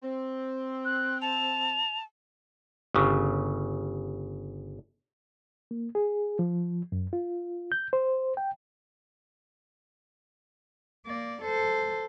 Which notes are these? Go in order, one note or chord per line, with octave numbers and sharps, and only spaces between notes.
C4
F#6
A5 F7
G1 C#3
A#3
G#4
F3
F#2
F4
G6
C5
G5
A#3 D5
A4 C5